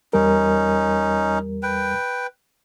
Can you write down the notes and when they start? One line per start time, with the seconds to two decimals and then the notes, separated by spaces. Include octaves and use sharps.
0.13 E2 G3 C#4 D#4 A#4
1.63 B4 G5